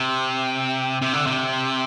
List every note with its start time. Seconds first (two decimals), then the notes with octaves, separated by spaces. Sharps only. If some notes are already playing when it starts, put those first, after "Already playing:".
Already playing: C3
1.02 C3
1.13 D3
1.26 C3